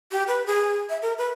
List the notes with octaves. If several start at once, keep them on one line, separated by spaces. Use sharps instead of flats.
G4
B4
G#4
E5
A#4
B4